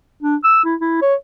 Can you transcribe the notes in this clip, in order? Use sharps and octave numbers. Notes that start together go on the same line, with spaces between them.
D4
E6
E4
E4
C#5